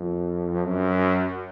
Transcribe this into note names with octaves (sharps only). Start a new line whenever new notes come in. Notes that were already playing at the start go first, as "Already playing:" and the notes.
Already playing: F2
F#2